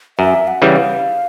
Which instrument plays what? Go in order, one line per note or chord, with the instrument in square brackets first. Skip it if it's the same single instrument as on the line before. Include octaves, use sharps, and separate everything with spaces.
[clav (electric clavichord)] F#2 [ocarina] E5
[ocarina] F#5
[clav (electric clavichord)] C#3 E3 G3
[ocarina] F5